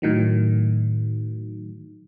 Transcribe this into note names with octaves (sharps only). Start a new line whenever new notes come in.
A2 D#3 F#3